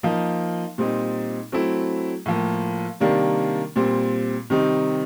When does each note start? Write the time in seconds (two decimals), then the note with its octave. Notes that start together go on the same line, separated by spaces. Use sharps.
0.03 F3 A#3 D#4
0.78 A#2 G3 C4 D#4
1.52 F#3 A3 C4 E4
2.26 A2 F3 A#3
3.00 C3 D#3 G3 A#3 D4
3.76 A#2 G3 C4
4.50 C3 D#3 G3 C4 D#4